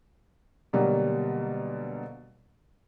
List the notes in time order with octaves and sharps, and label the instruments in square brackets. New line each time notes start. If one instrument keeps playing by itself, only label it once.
[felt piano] B2 D3 F#3 G3 A#3